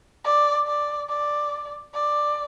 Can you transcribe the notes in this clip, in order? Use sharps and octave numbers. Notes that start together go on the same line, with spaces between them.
D5
D5
D5
D5